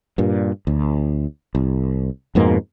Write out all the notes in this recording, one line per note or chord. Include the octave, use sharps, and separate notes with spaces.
G2 A#2
D2
C2
F2 G#2 B2 A#3